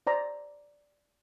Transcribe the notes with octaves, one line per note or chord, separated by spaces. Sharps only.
C5 D5 A#5